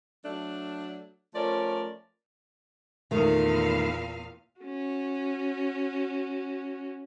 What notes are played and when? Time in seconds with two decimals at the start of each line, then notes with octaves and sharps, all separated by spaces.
0.24 F#3 A3 D4
1.35 F3 A3 C#4 A#4 D5
3.11 E2 A#2 D#3 A3 F5
4.61 C#4 F#4